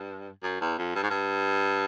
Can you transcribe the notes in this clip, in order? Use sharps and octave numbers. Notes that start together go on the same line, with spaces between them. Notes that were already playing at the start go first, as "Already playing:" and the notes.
Already playing: G2
F#2
E2
F2
G2
G#2
G2